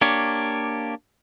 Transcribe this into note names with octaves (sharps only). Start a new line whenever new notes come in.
A#3 D4 G4 C#5